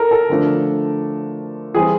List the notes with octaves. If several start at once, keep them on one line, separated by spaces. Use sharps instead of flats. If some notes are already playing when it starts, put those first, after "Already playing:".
Already playing: A4 A#4
A4
D3 F3 A3 D4
E3 G3 C4 G#4